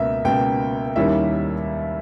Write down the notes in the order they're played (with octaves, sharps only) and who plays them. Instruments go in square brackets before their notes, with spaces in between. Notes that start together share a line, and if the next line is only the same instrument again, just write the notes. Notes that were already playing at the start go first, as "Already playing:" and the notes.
Already playing: [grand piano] C#2 B2 A#3 E5
C#2 B2 A#3 G5
D#2 D#3 G3 C#4 E4 E5